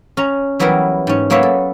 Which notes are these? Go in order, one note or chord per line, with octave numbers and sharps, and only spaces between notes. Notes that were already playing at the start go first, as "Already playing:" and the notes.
C#4 A#5
E3 F#3 G3 B3 E4 A#4
G#2 C#4
F#3 A#3 B3 C#5 E5
A4